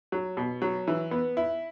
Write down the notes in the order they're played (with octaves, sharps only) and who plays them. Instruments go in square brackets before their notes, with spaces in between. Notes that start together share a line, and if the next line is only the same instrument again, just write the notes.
[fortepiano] F#3
B2
F#3
E3
B3
E4